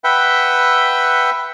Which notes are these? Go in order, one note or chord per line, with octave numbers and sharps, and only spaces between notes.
B4 E5 F#5 G5